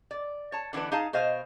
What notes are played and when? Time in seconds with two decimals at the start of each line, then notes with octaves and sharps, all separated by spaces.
0.11 D5
0.52 C#5 A5
0.73 D3 E3 B3 D4 B4
0.92 D#4 G#4 F5 A5
1.13 B2 C5 D#5 F5